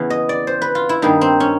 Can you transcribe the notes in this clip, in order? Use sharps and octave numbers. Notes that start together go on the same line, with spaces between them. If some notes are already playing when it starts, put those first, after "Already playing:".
Already playing: E2 C#3 E3
D#5
D5
C5
B4
F4
E4
G2 D#3 G3 A#3 D#4
C4
C#4